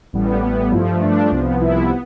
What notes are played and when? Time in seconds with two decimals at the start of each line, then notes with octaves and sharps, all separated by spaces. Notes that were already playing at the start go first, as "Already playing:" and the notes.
0.13 A1 A2 G3 B3
0.42 A1 A2 G3 B3
0.72 G2 F3 A3 E4
1.01 G2 F3 A3 D4
1.31 C2 C3 F3 B3 D4
1.60 C2 C3 F3 B3 E4
1.90 B3